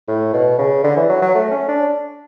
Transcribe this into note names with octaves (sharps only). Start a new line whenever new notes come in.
A2
B2
C#3
D3
E3
F#3
F#3
A3
C#4
D4